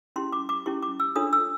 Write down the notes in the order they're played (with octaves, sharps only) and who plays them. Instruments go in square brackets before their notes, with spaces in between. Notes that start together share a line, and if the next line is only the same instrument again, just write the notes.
[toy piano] C#4 E4 G4 C6
D6
D6
C#4 E4 G4 C#6
D6
E6
D4 F4 A4 C#5 D#6
E6